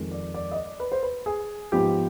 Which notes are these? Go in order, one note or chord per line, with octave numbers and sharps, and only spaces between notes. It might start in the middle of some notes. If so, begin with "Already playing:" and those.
Already playing: F2 D#3 G#3
D5
D5
D#5
D5
B4
C5
B4
G#4
G#2 F3 B3 G4